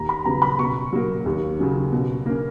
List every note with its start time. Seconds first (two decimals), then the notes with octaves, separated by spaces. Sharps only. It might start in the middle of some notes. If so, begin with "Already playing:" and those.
Already playing: D#2 A#5
0.09 B5
0.25 C#3 F#3 B3 A#5
0.42 B5
0.59 B2 C#6
0.92 F#3 A#3
1.26 D#2
1.59 C#3 F#3 C#4
1.92 B2
2.26 A#3 C#4